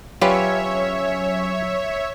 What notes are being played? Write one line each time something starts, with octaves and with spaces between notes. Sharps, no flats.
F#3 C#4 F4 G4 B4 C#5 E5